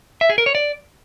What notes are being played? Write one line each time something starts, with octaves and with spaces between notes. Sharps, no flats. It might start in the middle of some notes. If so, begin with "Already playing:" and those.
E5
G#4
A#4
C#5
D5